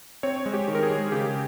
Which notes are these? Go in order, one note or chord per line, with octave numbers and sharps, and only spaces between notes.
C4 C#5
G#3
G4
D#3
A#4
G#4
G#3
C#3 G4